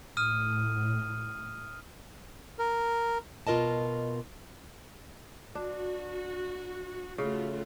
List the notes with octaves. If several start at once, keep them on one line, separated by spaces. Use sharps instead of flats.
A2 D#6 F6 D#7
A#4
B2 F4 A#4 D#5 A5
D4 F#4
C#3 A3 F4 F#4